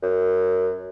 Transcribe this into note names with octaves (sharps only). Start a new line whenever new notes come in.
F#2